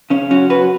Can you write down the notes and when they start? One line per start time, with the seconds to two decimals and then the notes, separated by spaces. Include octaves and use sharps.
0.10 C#3 C#4
0.30 F#2 C#4 F#4
0.50 F#2 F#4 B4